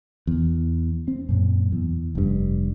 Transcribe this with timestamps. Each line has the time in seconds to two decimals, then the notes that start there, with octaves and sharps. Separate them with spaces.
0.27 E2
1.08 C4
1.29 F#2 A#2
1.72 E2
2.15 F1 G2